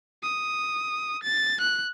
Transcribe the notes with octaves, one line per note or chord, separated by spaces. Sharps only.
D#6
A6
F#6